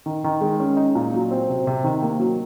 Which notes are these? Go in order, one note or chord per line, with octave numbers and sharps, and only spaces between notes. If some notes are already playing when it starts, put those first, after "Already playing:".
D#3
D#3
G#3
C#4
D#4
A#2
F#3
C4
C3
C3
D#3
A#3
F#3